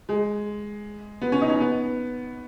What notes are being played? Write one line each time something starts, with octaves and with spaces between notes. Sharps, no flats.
G#3
B3
C#4
D#4
C#4
B3